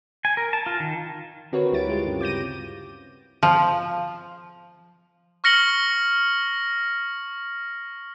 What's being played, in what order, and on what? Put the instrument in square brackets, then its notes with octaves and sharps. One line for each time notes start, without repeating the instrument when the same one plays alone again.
[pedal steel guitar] G#5
A#4
A5
F4
D#3
[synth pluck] D3 C4 F#4 A#4 B4 C#5
D2 G3 E4 A6 D7
G#3 F4 G4
G2 C#3
D6 G6 A#6 D#7
[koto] F3
[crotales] C#6 F6 A#6 C#7 F#7 G7